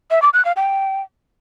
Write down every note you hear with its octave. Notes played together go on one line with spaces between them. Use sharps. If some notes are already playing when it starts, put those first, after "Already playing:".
E5
D6
F#6
F5
G5